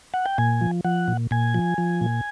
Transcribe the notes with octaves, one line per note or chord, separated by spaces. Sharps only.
F#5
G5
A#2 G#5
F3
F3 F#5
A#2
A#2 G#5
F3
F3
A#2